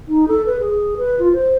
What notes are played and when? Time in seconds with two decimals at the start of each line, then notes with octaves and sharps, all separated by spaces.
0.08 D#4
0.28 A4
0.46 B4
0.60 G#4
0.97 B4
1.19 F4
1.33 C5